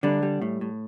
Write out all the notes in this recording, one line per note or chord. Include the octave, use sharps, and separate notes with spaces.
D3 G3 D4
G3
A2
A2